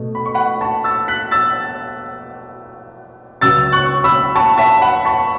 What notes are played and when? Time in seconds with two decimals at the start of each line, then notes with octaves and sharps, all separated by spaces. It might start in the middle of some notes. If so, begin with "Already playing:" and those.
Already playing: B2 A3
0.15 B5
0.25 C#6
0.34 F#5 B5
0.61 A5 C#6
0.84 E6 A6
1.08 F#6 B6
1.31 E6 A6
3.41 C#2 C#3 F#3 E6 A6
3.72 C#6 F#6
4.04 B5 E6
4.36 A5 C#6
4.58 E5 A5
4.81 F#5 B5
5.05 A5 C#6